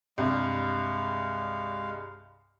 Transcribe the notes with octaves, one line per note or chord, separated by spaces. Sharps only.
C2 G2 G#3 F5